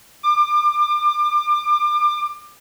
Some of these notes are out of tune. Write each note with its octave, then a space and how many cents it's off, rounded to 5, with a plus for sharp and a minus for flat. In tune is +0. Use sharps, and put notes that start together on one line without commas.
D6 +30